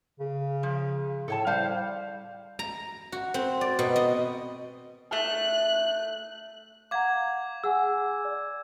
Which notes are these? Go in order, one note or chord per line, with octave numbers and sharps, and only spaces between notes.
C#3
F3
A2 A4 C#5 A5
G3 C5 F5
A#5
F#4
C4
D5
B2
D#5
A3 F#6
F5 F#5 A#5 D6 G#6
G#4 F#5 G#5 E6
D5